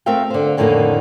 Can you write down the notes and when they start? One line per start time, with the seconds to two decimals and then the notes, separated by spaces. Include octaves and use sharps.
0.06 A3 C4 A#4 E5 F5 G5
0.30 D3 C5
0.57 F2 A2 D3 D#3 G3 A#3